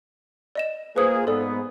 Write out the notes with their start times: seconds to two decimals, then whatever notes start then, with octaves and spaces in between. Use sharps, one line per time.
0.55 D5 D#5 E7
0.96 A#3 F4 G#4 B4 C5 D#6
1.27 G#2 B3 A4 D5